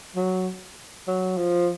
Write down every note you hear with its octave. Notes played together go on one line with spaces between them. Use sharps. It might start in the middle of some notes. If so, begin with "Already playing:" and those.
F#3
F#3
F3